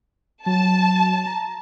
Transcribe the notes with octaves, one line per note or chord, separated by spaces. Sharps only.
F#3 A5
A#5